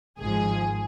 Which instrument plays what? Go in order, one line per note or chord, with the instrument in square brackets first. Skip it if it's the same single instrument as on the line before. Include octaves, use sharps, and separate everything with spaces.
[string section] G#1 G#2 F3 G#4